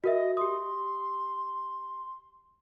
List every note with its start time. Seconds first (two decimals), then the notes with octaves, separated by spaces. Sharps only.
0.04 F#4 A#4 D#5 E5
0.37 G4 C6 D#6